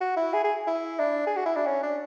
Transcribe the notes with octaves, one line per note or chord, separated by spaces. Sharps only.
F#4
E4
G#4
G#4
E4
D4
G#4
F#4
E4
D4
C#4
D4